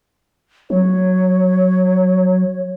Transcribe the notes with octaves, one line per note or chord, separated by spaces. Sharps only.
F#3 C#5